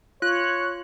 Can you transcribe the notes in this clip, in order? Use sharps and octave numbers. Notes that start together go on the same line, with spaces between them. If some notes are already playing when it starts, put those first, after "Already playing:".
F4 C#5 F#6